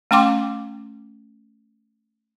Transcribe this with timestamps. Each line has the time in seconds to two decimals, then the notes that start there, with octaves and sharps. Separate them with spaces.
0.11 A3 C#4 G5 C6 D6